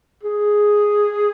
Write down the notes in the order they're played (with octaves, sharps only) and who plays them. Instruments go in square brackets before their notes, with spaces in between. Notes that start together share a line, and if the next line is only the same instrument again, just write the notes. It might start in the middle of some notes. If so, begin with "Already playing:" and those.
[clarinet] G#4